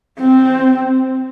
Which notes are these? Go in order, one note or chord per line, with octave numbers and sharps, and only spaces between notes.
C4